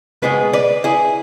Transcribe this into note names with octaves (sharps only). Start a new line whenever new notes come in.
C#2 B2 G#3 B3 G#4 B4
B4 D5
E4 G#4